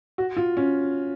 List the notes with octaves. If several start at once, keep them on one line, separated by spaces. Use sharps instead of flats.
F#4
F4
C#4